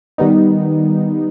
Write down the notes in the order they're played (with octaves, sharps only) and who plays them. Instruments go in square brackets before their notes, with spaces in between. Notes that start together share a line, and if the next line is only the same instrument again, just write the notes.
[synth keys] D#3 G3 B3 D#4